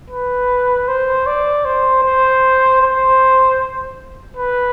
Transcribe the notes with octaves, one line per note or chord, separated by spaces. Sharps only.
B4
C5
D5
C5
C5
C5
B4